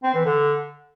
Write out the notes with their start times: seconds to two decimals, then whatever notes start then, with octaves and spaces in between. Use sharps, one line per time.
0.04 C4
0.14 E3
0.25 D3